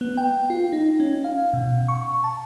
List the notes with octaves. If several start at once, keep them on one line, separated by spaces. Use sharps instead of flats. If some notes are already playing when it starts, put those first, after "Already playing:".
B3
G5
F4
D#4
C#4
F5
B2
C#6
A5